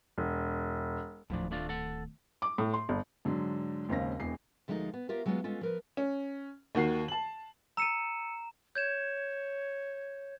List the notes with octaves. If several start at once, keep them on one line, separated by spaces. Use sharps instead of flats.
E1
D1 A2 D#3 F3 D4
A3 D4 F4
A4 F#5
D6
A2
C6
G1
G#2 D3 F#3
G#1 D#2 C#3 C4 F5 A#6
E1 E2 C7
D2 F3 G#3 A#3 D#4 A4
B3
F4 G4 A#4 E5
F#3 G#3 B3 C#4 F4
G#3 B3 C#4 F4 A4
F3 A#4 B4
C#4
D#2 D#3 F#4 C7
A5 F#7
A#5 E6 C#7 D#7 E7
C#5 G6 G#6 E7